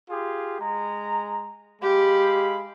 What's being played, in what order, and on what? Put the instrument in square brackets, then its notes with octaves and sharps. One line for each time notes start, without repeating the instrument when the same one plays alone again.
[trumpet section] F4 G4 G#4
G#3 A#5
[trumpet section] G#3 F5 B5 [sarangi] G4